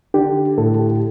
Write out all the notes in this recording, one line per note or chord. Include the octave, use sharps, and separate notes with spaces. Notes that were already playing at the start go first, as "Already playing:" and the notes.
D3 G4
A2 A4
G4